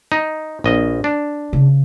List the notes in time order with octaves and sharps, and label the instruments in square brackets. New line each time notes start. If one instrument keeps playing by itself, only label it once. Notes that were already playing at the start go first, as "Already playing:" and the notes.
[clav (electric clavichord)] D#4
A#1 D#5
D4
[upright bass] C#3